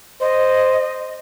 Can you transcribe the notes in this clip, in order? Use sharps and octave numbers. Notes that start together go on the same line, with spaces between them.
C5 D#5